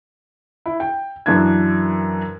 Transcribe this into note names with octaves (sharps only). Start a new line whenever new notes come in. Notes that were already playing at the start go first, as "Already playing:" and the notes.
E4
G5
F#2 E3 D4 G#6